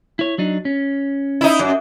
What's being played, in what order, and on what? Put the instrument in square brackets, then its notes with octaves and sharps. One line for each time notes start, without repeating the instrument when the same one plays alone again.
[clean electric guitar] E4 C#5
F#3 D4 D#4
C#4
[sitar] D#4 E4
F#2